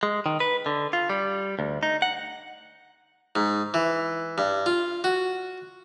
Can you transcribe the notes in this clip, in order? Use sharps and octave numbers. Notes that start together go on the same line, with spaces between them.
G#3
D#3
B4
D3
F4
G3
D2
D#4
F#5
G#2
E3
G2
F4
F#4